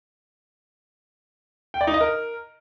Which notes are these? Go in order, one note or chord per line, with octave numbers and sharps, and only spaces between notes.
G5
D5
D#4
D#5
A#4